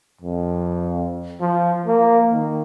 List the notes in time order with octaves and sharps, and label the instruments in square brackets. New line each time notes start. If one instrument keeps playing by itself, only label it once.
[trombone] F2
F3
A#3
D#3